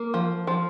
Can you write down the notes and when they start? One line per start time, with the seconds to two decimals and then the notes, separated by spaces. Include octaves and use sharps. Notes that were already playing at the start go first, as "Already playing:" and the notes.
Already playing: A#3 A#4
0.14 F3
0.47 F3